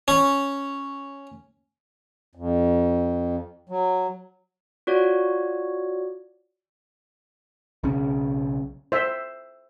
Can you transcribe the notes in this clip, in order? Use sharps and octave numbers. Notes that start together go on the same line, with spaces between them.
C#4
F2
F#3
F4 F#4 C#5 D5
B1 C#3 C#4
C5 E5